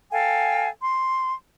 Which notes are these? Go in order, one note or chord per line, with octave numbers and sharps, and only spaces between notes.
A4 F5 G5 G#5
C6